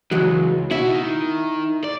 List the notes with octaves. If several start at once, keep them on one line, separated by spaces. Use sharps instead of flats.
C#2 E3 F#3 G#3
B2 E4 F#4
D#3
D5